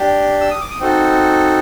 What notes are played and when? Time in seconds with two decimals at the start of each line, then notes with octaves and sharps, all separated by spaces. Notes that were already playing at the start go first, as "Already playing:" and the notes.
Already playing: D4 G4
0.41 E6
0.51 D#6
0.61 D6
0.71 D#6
0.80 C4 D#4 F#4 A4